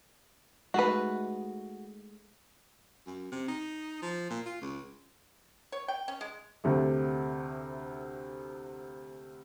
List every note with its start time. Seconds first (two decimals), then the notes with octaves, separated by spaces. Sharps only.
0.74 G#3 A3 D#4 F#4 B4
3.07 F#2
3.32 C3
3.48 D#4
4.02 F3
4.30 A#2
4.46 F4
4.62 C#2
5.72 C#5
5.88 G5
6.08 C#4
6.21 G#3
6.64 D2 C3 A3